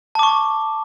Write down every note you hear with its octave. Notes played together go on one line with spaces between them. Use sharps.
A5 C#6 D6